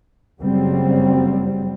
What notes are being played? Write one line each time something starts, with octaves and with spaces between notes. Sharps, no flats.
F#1 C#3 F#3 G3 C4